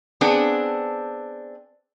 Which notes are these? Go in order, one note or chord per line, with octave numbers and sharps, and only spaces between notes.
B3 C4 D4 G#4